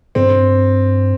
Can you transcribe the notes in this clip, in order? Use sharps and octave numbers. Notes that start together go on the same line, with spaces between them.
G2 C4